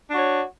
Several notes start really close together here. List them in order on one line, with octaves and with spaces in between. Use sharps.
D4 F#4 C#5